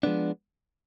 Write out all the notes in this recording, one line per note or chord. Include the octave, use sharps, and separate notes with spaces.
F3 G#3 B3 D4